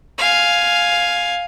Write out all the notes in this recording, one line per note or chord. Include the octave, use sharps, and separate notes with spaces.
F5 G#5